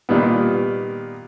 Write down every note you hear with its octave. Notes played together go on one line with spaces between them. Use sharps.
A#2 D#3 G3 B3